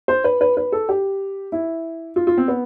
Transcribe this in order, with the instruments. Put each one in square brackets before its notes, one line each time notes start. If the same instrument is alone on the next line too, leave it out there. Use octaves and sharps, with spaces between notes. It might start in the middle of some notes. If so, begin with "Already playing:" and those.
[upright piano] C5
B4
B4
B4
A4
G4
E4
F4
F4
C4
B3